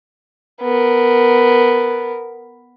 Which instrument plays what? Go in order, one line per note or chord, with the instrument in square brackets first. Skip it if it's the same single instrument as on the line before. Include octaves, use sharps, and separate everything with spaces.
[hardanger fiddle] B3 A#4